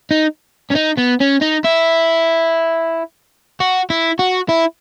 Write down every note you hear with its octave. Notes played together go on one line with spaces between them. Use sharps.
D#4
C#4
D#4
B3
C#4
D#4
E4
F#4
E4
F#4
E4